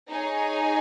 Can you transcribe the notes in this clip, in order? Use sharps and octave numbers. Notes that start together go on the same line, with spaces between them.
D#4 G#4 C#5 G#5